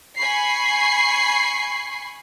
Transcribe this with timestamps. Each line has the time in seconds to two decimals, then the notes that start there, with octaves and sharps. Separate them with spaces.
0.17 G#5 B5 C#6 C7